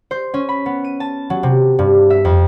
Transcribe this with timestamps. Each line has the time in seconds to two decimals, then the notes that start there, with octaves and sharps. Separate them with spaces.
0.11 C5
0.34 C#4
0.49 B5
0.66 B3
0.84 D#7
1.00 A5
1.30 F#3
1.43 C3
1.79 G2
2.10 E5
2.25 F2